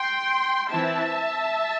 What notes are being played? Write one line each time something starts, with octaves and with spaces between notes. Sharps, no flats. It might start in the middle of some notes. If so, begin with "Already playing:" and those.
Already playing: G5 C6
E3 C4 E4 E5 A5